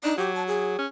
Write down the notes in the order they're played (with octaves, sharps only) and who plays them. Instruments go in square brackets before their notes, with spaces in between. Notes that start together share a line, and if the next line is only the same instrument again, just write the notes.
[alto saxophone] D4 [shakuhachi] D#4
[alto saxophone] F#3 [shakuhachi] G4
[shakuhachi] A5
G#4
[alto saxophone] C#4